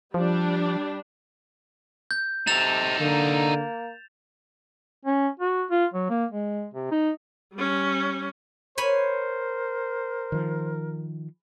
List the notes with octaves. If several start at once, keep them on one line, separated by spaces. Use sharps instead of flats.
F3 G3 D4
G6
C3 D#4 A4 A6 E7 F7
D3 A#3
C#4
F#4
F4
F#3
A#3
G#3
C3
D#4
G3 C#4
A#4 C5 C#5 G#5 B5
D#3 F3